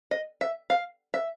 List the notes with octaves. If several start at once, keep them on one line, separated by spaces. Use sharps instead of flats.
D#5
E5
F5
E5